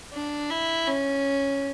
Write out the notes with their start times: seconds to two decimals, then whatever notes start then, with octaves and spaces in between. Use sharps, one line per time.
0.13 D4
0.50 E4
0.88 C#4